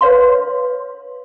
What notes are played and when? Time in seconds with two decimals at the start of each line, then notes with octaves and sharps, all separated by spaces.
0.01 B4 C#5 F5 C6